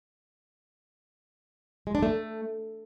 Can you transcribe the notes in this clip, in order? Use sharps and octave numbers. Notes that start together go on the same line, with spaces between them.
G#3
D4
A3